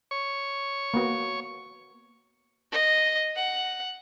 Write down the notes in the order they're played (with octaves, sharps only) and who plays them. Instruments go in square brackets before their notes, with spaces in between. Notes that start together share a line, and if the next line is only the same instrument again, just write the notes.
[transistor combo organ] C#5 C#6
[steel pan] A#3 B3 F#4
[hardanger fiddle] D#5
F#5